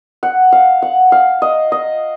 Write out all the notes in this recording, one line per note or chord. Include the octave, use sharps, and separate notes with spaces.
F#5
F5
F#5
F5
D#5
D#5